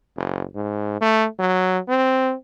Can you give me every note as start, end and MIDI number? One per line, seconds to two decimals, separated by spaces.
0.17 0.44 30
0.55 0.97 44
1.01 1.26 57
1.39 1.79 54
1.88 2.34 60